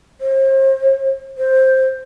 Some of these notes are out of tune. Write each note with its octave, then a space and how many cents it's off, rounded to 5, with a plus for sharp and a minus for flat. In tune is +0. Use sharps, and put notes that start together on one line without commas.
C5 +40
C5 +5